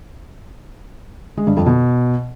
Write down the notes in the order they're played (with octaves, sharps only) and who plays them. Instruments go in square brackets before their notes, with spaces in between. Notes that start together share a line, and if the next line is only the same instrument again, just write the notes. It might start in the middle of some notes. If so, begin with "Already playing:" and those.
[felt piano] G#3
G2
F2
B2